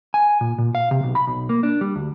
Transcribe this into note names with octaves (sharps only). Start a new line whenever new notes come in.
G#5
A#2
A#2
F5
C3
B1
B5
B1
A#3
D4
G3
D2